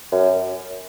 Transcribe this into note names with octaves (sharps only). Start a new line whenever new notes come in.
F#2